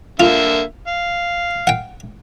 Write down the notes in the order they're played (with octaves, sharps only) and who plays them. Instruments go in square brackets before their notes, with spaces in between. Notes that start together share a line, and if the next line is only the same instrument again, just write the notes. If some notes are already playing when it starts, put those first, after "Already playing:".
[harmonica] D3 A#3 E5 [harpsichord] F4
[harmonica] F5
[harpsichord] F#5 G5